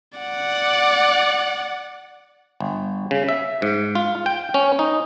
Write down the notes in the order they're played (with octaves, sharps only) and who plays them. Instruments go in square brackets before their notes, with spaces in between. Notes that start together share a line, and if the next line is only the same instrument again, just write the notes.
[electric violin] D5 F#5
[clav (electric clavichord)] G1
C#3
E5
G#2
F4
G5
C#4
D#4